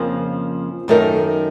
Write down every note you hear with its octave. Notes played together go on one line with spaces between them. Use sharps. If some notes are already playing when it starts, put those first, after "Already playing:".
Already playing: F2 C#3 F3 A#3
F#2 D#3 A3 D#4 A#4